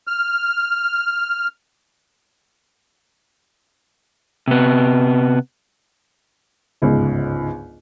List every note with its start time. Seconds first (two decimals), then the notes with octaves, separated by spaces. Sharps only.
0.07 F6
4.48 C3 B3
6.82 G1 C#2 G#2